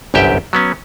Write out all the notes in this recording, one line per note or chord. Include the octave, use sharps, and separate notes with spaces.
G1 C2 F#2 G4 E5 G5
F#3 B3 C#4